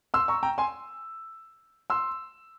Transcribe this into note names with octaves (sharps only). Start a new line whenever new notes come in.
C6 E6
A#5 C#6
G5 A#5
G#5 C6
C6 E6